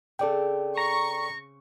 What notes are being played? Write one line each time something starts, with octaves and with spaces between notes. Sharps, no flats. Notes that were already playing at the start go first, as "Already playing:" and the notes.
C#3 C4 A4 D5 G5
A#5 C#6